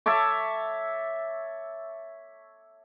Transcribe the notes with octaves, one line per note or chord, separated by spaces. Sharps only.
C#5 E5 A5 D6